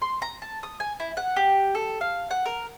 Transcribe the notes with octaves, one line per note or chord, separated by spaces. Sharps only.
C6
A#5
A5
D#6
G#5
E4
F#5
G4
A4
F5
F#5
A#4